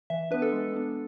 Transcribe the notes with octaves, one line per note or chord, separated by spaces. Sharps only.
E3 E5
B3 D4 B4
A4
G#3
B3 D4